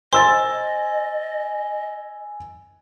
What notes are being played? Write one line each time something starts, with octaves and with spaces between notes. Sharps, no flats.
C5 D#5 G#5 C6 E6 A6